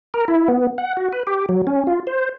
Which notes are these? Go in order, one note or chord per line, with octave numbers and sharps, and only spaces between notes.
A#4
E4
B3
F#5
F#4
B4
G4
F#3
C#4
F4
C5